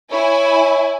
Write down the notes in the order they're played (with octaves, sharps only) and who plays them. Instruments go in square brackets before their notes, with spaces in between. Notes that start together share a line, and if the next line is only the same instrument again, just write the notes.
[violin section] E4 G#5 [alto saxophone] C#5